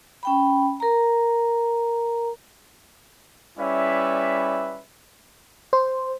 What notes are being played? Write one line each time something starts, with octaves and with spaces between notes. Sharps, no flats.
C#4 G5 B5
A#4 A#5
G3 C#4 E4 B4 D5 E5
C5